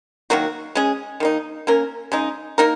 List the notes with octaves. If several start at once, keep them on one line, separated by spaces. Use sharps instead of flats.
D#3 F#3 A#3 F#4
G#3 C#4 G#4
D#3 A#3 D#4
A#3 C#4 A#4
C#3 G#3 D#4
A#3 D#4 A#4